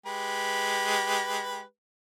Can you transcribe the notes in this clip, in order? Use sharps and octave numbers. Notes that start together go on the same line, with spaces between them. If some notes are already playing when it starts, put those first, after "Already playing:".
G#3 G4 B4